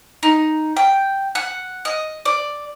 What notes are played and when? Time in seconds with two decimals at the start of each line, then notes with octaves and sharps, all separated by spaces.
0.23 D#4
0.77 G5
1.35 F#5
1.85 D#5
2.25 D5